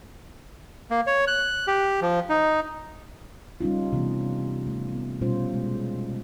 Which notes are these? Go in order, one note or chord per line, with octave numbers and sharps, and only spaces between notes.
A#3
C#5
F#6
G4
F3
D#4
G3 C#4 D#4 F4
C3 E3 B3
A3
B3
B2 G3 C#4 F4 C5
G#3